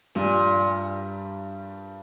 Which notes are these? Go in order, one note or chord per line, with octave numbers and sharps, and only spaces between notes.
G2 A#2 G3